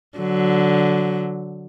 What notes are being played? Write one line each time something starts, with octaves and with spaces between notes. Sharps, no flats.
D3 F#3